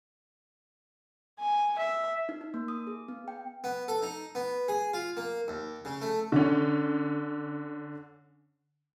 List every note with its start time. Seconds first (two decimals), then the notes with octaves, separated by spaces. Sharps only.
1.39 G#5
1.79 E5
2.29 D#4
2.41 D#4
2.54 A#3
2.68 D#6
2.87 G#4
3.08 B3
3.28 G5
3.64 B3
3.88 A4
4.02 D#4
4.35 B3
4.68 G#4
4.93 F4
5.17 A#3
5.48 D#2
5.85 C#3
6.02 A3
6.32 D3 C#4